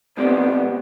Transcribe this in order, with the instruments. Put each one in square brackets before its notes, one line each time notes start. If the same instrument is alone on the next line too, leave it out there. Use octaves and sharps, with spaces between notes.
[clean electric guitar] B2 G#3 C4 G4 D5 [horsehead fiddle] B3